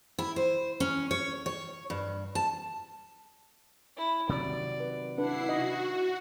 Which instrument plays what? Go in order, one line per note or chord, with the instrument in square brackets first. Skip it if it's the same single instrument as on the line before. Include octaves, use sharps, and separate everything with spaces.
[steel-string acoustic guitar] E4
C5
C#4
C#5
C#5
G2
A5
[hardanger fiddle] E4
[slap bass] C3 D#3 F#3 [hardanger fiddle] D5
[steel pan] B4
[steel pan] D4 B4 [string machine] E4 C7 [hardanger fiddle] F#5
[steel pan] D#4 D#5 [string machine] F#4